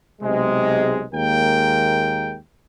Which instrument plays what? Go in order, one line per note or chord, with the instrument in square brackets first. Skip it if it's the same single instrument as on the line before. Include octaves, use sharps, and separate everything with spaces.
[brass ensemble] B1 C3 G#3
D#2 G#3 A#3 A#4 G5